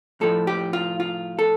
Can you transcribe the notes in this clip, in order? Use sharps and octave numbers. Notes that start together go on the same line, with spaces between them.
A2 F3 A4
G4
F4
F4
A4